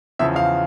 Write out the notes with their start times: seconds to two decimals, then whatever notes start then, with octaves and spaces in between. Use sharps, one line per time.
0.19 E2 C#3 F3 E5
0.36 F5